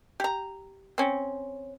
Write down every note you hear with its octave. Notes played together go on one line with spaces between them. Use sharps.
G4 A#5
C4 C#4